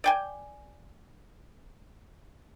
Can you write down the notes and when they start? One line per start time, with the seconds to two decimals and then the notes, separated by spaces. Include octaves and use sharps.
0.04 D5 G5 G#5